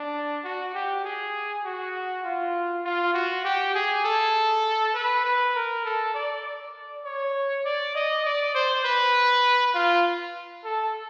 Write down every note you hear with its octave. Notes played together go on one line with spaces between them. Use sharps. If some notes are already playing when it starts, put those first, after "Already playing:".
Already playing: D4
F#4
G4
G#4
F#4
F4
F4
F#4
G4
G#4
A4
B4
B4
A#4
A4
D5
D5
C#5
D5
D#5
D5
C5
B4
F4
A4